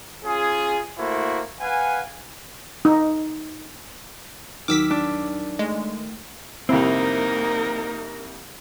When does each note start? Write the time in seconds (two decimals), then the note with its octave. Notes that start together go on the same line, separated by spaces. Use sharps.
0.24 C#4 F4 G#4
0.97 A3 A#3 E4 F#4 C5
1.60 B4 F5 F#5 G#5
2.85 D#4
4.68 D#2 D#3 F#3 D6 E6 F6 B6
4.90 D4
5.59 G#3 A3
6.69 C2 F2 A#3 C4 D#4 E4 A#4